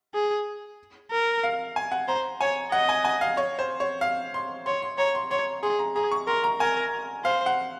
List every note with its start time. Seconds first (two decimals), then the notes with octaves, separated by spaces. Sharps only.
0.14 G#4
1.11 A#4
1.43 F5
1.76 G#5
1.92 F#5
2.07 C5 A#5
2.41 C#5 G#5
2.72 D#5 F#5
2.89 G#5
3.05 G#5
3.21 F5
3.37 C#5
3.59 C5
3.80 C#5
4.01 F5
4.34 C6
4.66 C#5 C6
4.82 C6
4.98 C#5 A#5
5.15 C6
5.31 C#5 C6
5.63 G#4 C6
5.79 A#5
5.96 G#4 A#5
6.11 C#6
6.27 A#4 C6
6.44 A#5
6.60 A#4 G#5
7.24 C5 F5
7.46 F#5